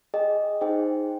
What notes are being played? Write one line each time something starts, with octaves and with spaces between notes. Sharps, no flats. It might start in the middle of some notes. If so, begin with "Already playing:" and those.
G#4 D#5 G5
D#4 G#4 C5 G5